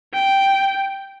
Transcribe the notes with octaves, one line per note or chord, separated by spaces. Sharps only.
G5